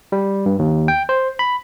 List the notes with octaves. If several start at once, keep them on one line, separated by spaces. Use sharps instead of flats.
G3
G2
D#2
G5
C5
B5